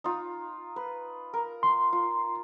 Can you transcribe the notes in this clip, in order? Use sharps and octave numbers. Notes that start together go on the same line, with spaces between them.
D#4 F4
B4
A#4
C6
F4